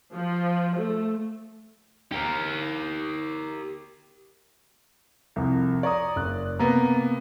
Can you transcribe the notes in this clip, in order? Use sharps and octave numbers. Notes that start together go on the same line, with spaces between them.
F3
A3
G4 A#4
C2 F2
C#5 D5 A#5 D#6
F#1 F#6
C3 A#3 B3 A#5